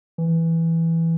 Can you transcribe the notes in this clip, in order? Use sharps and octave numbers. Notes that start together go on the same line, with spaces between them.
E3